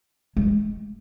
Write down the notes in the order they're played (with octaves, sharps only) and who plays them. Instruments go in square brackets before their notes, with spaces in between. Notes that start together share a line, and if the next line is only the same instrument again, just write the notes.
[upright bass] G#3